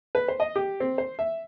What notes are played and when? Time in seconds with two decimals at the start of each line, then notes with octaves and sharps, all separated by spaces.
0.15 B4
0.28 C5
0.40 D#5
0.56 G4
0.80 C4
0.98 C5
1.19 E5